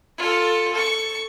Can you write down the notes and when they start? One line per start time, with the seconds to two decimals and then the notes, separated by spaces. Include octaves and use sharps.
0.18 F4 A4
0.73 A4 C#6